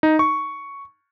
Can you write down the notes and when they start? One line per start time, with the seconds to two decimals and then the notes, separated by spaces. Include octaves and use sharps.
0.03 D#4
0.19 C#6